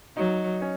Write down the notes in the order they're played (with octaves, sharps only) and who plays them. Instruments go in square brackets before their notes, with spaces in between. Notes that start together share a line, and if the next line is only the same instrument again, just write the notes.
[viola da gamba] F#3 [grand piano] D#4
[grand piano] C#4